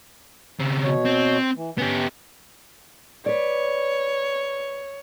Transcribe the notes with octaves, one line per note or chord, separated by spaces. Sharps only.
C#3 C4
B2 C#5
C4
E3
B3 C#4 G4
B4 C#5 D5